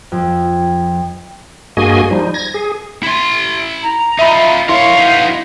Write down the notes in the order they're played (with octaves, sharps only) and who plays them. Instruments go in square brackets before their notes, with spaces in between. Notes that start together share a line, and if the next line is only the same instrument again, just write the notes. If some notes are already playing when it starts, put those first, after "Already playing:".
[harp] F2
[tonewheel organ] G2 A#3 F#4 G#4 D#5 G#5
F3 G3 D#4
G#6 A#6
G#4
[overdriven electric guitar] E4 C6
[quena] A#5
[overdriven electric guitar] D#4 F4 [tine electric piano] E5 B5
[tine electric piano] E4 C6 [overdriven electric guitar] A#4 C#5 [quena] F5
[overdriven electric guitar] B3 D#4